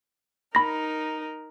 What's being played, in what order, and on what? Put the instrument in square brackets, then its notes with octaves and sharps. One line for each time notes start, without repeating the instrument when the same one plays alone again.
[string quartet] D#4 A#4 [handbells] B5 A#6